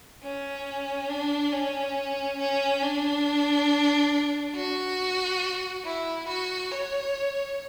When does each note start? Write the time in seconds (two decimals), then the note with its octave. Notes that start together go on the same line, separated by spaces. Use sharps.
0.23 C#4
1.09 D4
1.52 C#4
2.39 C#4
2.82 D4
4.55 F#4
5.85 E4
6.28 F#4
6.72 C#5